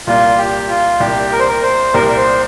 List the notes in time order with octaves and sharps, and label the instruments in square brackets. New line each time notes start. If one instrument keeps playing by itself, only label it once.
[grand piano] C2 A#2 G3 [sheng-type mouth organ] F4
[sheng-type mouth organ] G4
F4
[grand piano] C2 A#2 G3 [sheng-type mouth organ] G4
[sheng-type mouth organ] A#4
C5
A#4
C5
[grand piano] C2 A#2 G3 [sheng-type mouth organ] A#4
[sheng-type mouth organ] A#4
C5